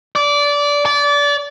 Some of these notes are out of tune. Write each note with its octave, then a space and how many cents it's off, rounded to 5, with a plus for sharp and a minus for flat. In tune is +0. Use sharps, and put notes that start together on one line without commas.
D5 -20
D5 -25